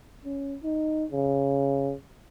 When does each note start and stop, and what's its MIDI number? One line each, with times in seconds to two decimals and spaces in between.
0.25 0.56 61
0.63 1.05 63
1.11 1.94 49